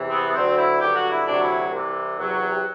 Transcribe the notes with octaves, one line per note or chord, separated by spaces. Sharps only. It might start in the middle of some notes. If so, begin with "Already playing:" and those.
Already playing: E2 C3 E3
C4
B3
B3
D2 D3 F#3 C4
E4
G2 D3 F#3 G4
F#4
E4
D2 C3 F#3 D4
E4
C2 C3 E3
E2 C3 F#3
G4